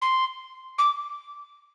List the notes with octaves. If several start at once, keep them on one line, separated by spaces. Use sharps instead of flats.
C6
D6